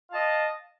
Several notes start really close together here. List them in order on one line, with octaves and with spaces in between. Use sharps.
F5 A5 D#5